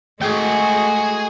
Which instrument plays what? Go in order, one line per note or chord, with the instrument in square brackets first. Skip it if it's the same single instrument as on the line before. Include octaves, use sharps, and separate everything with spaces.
[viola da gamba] G#3 A3 F#4 [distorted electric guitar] G#4 G5